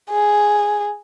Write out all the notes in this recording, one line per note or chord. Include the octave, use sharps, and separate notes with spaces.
G#4